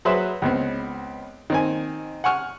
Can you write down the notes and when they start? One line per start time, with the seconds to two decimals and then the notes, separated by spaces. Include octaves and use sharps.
0.05 F#3 G#4 B4 C5 E5
0.42 C#2 B3 C4
1.50 D#3 C4 G#5
2.24 F#5 G#5 C#6 F6